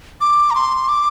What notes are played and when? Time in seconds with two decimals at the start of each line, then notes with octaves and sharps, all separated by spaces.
0.21 D6
0.51 A#5
0.55 C6
0.89 D6